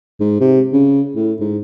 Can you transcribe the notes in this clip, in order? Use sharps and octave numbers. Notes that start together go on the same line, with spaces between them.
G#2
C3
C#3
A2
G#2